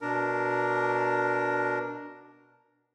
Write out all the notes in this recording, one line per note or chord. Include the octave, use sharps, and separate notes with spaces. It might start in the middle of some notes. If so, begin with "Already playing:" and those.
B2 D4 A#4